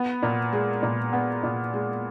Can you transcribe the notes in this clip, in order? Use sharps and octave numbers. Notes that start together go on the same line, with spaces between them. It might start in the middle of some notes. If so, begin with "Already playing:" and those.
Already playing: B3
A#2
G#3
A#2
B3
A#2
G#3